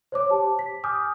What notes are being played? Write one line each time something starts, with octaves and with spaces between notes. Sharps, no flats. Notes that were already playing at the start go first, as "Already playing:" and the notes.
C5 C#5 D6
G4 A5
B6
G#5 D6 D#6 F6 G6